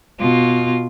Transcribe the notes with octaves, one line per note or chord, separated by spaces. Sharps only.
B2 F4